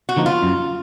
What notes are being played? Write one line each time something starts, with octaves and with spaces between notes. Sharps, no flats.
F#4
D3 F3 A#3 D#4
F4
F#2